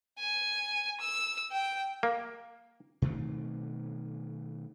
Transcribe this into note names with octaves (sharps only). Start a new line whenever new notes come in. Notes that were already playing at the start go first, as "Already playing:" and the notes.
G#5
E6
G5
A#3
B2 D#3 A3 C4